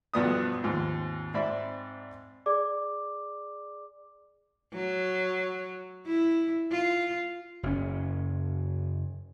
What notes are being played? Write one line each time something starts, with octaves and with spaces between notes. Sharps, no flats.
B1 G2 F3 B3 D5 D#6
D#2 G#2 F3 C4
G#2 C4 D5 E5 B5
G#4 D5 D6
F#3
E4
F4
F#1 C#4